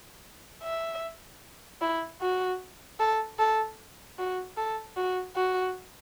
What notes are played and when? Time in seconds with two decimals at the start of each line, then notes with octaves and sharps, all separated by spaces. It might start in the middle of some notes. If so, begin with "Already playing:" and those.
0.63 E5
1.81 E4
2.21 F#4
2.99 A4
3.39 A4
4.18 F#4
4.57 A4
4.97 F#4
5.36 F#4